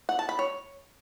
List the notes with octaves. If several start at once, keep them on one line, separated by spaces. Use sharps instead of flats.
F#5
A5
B5
C#5